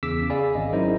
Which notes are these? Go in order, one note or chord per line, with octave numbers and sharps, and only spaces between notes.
E2 C#3 D6 E6 B6
G#4 D5 F5 G#5 B5
G#1 C#4 D#5
F#3 D#4 E4 A#4 C5 D#5